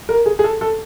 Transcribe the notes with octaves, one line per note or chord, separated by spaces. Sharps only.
A#4
G#4
G#4
A4
A4